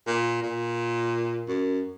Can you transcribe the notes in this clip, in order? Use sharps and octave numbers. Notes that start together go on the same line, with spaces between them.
A#2
A#2
F#2